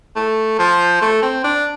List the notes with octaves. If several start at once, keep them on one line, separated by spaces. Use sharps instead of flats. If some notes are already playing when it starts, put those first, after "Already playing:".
A3
F3
A3
C4
D4